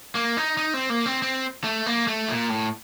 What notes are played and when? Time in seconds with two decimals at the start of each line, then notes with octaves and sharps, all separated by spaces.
0.15 A#3
0.37 D#4
0.57 D#4
0.74 C4
0.90 A#3
1.06 C4
1.22 C4
1.64 A3
1.86 A#3
2.07 A3
2.28 A#2
2.49 A2